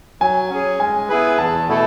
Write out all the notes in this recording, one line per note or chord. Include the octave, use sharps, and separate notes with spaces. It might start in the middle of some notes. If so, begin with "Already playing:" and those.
F#3 G#5
C#4 G#4
G#3 G#5
B3 E4 G#4 B4
E2 A5
B2 A3 E4 A4